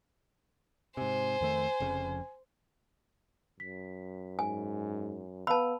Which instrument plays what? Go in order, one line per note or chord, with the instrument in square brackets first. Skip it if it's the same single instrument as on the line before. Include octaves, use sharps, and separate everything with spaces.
[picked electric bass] G#2 C3 [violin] C5 [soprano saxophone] G#5
[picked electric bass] F2 D#3 A3
F1 F2 C#3
[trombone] F#2 [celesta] B6
[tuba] G#2 [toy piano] G#5
[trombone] B3 [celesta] B4 F5 E6 [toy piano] A5 B5